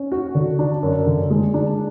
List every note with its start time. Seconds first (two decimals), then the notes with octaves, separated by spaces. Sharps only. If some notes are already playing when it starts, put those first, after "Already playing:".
Already playing: C#4
0.12 F#4
0.35 D3
0.59 D4
0.83 F#2
1.07 D3
1.30 G#3
1.54 D4